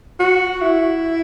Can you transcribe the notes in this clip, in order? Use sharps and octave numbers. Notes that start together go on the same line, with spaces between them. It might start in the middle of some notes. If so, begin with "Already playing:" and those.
F#4
E4